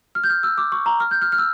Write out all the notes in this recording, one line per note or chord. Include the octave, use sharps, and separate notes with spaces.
F6
G6
F6
E6
D6
C#6
A#5
F6
G6
F6
F6
E6